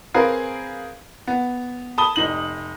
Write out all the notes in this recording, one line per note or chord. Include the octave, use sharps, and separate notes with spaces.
C4 G#4 A#4 B4 F5 G#5
B3
A5 B5 D#6 G7
F1 D#4 F#7